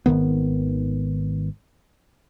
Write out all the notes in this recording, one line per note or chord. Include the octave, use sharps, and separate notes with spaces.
G#1 F#2 D#3 B3